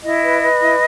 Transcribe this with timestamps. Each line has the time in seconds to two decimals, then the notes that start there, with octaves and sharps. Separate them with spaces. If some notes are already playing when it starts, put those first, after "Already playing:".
0.03 E4 D#5
0.23 B4
0.42 B4
0.60 E4